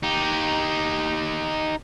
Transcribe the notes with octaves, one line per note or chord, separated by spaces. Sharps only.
D#4 G4